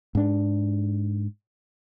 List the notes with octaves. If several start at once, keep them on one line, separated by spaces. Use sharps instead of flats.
G#2 D4